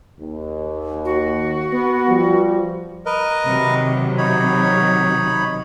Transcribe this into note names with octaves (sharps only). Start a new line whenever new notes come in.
D#2
F#4
B3
F3 G3
A#4 B4 D#5
C3 D#3 F#3
D#4 C#5 B5